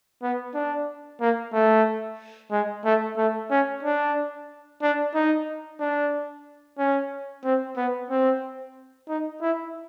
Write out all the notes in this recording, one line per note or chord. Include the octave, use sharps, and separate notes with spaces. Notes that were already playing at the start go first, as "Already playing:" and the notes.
B3
D4
A#3
A3
G#3
A3
A3
C#4
D4
D4
D#4
D4
C#4
C4
B3
C4
D#4
E4